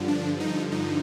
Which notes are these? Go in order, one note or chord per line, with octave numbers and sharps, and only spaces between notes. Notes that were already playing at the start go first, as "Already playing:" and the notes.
Already playing: G2 D3 F3
D4
D#4
D#4